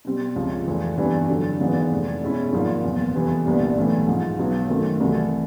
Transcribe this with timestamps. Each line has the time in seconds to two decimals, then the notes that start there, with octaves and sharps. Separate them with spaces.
0.05 B2 G3 C4
0.36 C#2 C3 F3 G#3
0.67 F1 F2 C3 E3
0.97 G2 E3 G3 B3
1.29 F2 D3 F#3
1.60 G#1 G#2 E3 G#3 B3
1.91 F1 F2 C3
2.21 B2 G#3 C#4 E4
2.53 G#1 G#2 F3 A#3
2.84 F#1 E2 B2
3.14 F2 C3 E3 G3 B3
3.46 C2 A#2 G3 B3 D4
3.76 B1 A2 E3
4.08 G#2 F3 G#3
4.39 B1 B2 F#3 B3
4.69 F#2 D#3 F#3 A3 C4
5.00 C2 C3 E3 A3